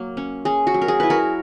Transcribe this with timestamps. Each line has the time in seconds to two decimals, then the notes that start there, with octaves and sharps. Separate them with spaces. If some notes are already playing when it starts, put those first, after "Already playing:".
Already playing: F#3 A#3
0.17 C#4
0.45 C#4 G#4
0.67 F#4
0.74 F#3
0.82 A#4
0.88 G#4
1.00 E4 B4
1.10 F#4 A#4